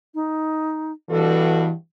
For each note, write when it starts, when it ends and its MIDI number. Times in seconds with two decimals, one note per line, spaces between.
0.15 0.92 63
1.10 1.68 43
1.10 1.68 47
1.10 1.73 52
1.10 1.68 66
1.10 1.61 69